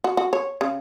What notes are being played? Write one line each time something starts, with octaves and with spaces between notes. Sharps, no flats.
F#4
F#4
C#5
C#3